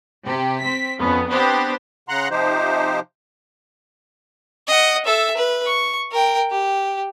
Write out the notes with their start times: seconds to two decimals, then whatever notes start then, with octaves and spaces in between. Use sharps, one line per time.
0.24 C3 G4
0.62 C4 B6
0.99 F2 B3 C#4
1.29 B3 C4 D4 G4 C5
2.09 C#3 F#5 A#5 C6 F#6
2.30 C3 F3 D#4 G4 C5
4.68 D#5 F#5
5.05 A4 E5
5.37 B4
5.66 C#6
6.11 A#4 G5
6.51 G4